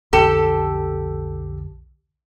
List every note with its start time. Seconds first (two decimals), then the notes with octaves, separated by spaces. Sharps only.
0.13 B1 F2 D3 G4 A4